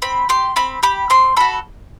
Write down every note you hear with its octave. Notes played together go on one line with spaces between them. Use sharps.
C4 B5
G4 C6
C4 B5
G4 B5
C4 C6
F#4 A4 B5